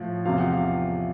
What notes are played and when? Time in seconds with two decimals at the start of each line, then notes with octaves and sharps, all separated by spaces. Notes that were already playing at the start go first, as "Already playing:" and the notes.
Already playing: A2 F3
0.26 E2 C3 F3 F5
0.39 F#5
0.52 F5